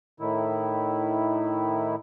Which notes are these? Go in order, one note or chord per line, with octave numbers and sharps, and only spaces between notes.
A2 D#3 E4